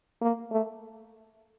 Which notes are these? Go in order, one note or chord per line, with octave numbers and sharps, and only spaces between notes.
A#3
A3